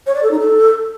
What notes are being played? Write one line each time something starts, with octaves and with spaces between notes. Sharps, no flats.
C#5
D5
A4
D#4
A4